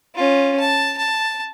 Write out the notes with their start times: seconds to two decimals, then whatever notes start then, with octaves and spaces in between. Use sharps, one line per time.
0.16 C#4 F4
0.60 A5
0.98 A5